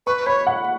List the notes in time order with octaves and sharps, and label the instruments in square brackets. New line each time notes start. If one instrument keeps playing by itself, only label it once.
[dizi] B4 [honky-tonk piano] C#6
[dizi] C#5 [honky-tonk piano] B5
[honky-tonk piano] F#5